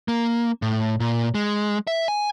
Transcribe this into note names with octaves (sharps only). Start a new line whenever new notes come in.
A#3
A2
A#2
G#3
E5
G#5